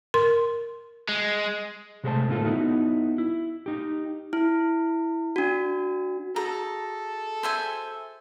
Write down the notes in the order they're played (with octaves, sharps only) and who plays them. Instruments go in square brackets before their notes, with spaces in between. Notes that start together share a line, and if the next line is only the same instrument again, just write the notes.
[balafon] A#4 C6
[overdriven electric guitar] G#3
[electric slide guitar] C3 G#3 A3 A#4 C5 A5
A2 D3 A#3 C4 F4 A4
B3 D#4 E4 F#4
E4
D#4 G4
[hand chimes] E4
D4 F#4
[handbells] F#4 G#4 [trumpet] A4 [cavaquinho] A#5
[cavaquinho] C5 E5 G#5